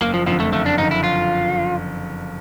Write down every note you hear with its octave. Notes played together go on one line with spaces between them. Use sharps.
F#1 A#3
F3
F2 D3 F3
A3
F#1 A3
D4
F2 D3 D#4
E4
F4